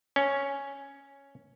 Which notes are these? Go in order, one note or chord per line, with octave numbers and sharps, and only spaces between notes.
C#4